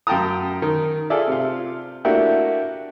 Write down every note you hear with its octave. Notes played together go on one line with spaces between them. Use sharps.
F#2 F5 G5 A5 A#5 D#6
D#3
F4 G#4 A4 D5 E5
C3 F4
A3 A#3 D4 E4 F#4 G4